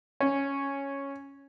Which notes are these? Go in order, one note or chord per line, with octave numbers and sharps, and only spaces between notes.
C#4